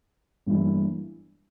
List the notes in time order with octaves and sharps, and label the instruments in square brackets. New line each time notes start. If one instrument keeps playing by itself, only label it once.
[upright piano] G1 G2 E3 A#3 E4